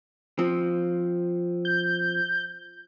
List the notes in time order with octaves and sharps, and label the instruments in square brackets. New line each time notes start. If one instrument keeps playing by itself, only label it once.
[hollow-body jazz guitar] F3 C4
[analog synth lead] G6